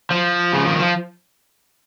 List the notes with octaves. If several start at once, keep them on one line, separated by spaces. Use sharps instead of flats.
F3
C#3
D#3
F3